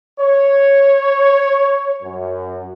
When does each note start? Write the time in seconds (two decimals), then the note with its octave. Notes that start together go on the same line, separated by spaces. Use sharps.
0.20 C#5
2.03 F#2